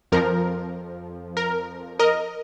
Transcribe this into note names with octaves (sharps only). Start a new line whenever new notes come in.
F2 F3 A#4
A#4
A#4 D#5